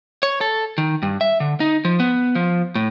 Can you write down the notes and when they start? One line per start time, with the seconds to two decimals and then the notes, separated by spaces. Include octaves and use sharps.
0.23 C#5
0.41 A4
0.78 D#3
1.03 G2
1.21 E5
1.40 D3
1.60 D#4
1.85 F3
2.00 B3
2.35 F3
2.75 A2